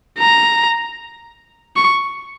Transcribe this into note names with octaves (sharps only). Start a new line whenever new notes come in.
A#5
C#6